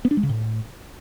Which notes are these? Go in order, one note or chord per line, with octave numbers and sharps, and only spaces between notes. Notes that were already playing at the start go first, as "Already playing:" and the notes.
B3
D4
G#3
C#3
A2